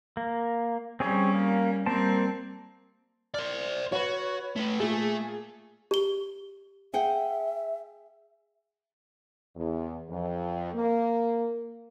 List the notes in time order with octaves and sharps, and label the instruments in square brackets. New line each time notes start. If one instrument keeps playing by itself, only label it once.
[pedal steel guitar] A#3
[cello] G3 C#4 [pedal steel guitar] C4 G#4 C#5
[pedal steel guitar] A#3
[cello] G3 C4 [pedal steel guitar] A#3 C5 A5
[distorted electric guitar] C5 D5 [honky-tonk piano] F6
[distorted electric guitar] F#4 [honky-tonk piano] B4 C#5
[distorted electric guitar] A3 B4
[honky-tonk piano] A#2 G#4 [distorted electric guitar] A3
[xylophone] G4 G7
[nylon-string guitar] G#4 F#5 G5 [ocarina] E5
[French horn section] E2
F2
A#3